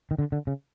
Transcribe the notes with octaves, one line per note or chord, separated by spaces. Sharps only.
D#3
D3
D3
C#3